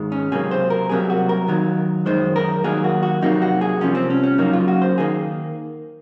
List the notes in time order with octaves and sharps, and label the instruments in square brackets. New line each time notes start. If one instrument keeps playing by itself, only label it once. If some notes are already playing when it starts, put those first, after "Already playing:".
Already playing: [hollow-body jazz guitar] G#2 D#3 G#3
C#4
C#2 C3 F#3 A#3 G#4
C5
A#4
C2 C3 F#3 A#3 G#4
F#4
A#4
D#2 D#3 F#3
F#2 D#3 G#3 C5
A#4
D#2 D#3 F#3 A#3 G#4
F#4
F#4
F2 C3 F#3 A#3 D#4
F#4
G#4
C2 C3 F3 C#4
C4
C#4
C#4
F#2 C#3 F#3 A#3 D#4
F4
F#4
C5
D#3 A#3 G#4